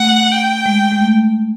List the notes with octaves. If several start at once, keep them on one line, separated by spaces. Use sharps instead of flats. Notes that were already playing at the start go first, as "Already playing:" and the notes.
Already playing: A3 F#5
G5
G#3
G#3
A3